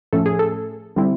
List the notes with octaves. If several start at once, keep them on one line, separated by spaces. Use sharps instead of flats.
A2 F3 A3 C#4 A4
G#4
A4
D3 G3 C4 E4